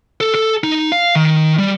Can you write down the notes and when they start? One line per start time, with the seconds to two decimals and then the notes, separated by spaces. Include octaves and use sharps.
0.21 A4
0.35 A4
0.64 D#4
0.92 F5
1.15 D#3
1.58 G3